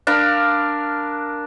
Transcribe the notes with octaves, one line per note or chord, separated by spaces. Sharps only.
D4 A#4 F5 B5